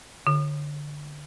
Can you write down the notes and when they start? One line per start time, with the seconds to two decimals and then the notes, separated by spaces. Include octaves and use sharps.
0.27 D3